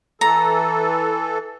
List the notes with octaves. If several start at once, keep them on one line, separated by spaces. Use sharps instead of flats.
E3 A4 A#5